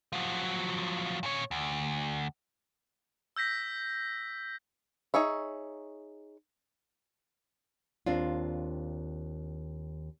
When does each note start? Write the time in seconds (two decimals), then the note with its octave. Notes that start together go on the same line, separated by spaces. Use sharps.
0.13 F3 F#3
1.23 A#2 C#5
1.51 D2
3.36 E6 G6 A#6 B6
5.14 D#4 G#4 C#5 E5
8.06 D#2 C4 D4 F4